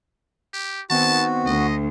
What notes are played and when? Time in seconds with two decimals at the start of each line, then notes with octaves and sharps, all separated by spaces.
0.54 G4
0.90 D#3 B3 C4 F#4 A5
1.46 D2 D#5